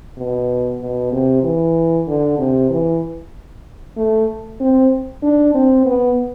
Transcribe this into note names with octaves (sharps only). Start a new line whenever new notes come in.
B2
B2
C3
E3
D3
C3
E3
A3
C4
D4
C4
B3